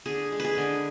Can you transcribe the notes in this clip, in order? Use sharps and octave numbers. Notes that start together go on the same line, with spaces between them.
D3 G#4
G#3
G#4 B4
D3